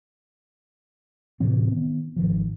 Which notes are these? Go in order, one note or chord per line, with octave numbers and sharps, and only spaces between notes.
A2 C3 E3 C4
D#3 B3
G#1 D#3 F3